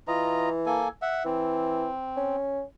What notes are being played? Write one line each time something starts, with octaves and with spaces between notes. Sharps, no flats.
E3 F4 D#5 A#5
A#3 A4 G#5
E5 F#5
E3 C4
C#4